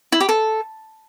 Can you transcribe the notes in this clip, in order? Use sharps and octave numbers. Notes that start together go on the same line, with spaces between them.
E4
G4
A4